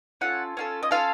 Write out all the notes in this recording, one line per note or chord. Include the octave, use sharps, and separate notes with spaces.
C#4 F4 A4 F#5
C#4 F4 A4
D#5
C#4 F4 A4 F5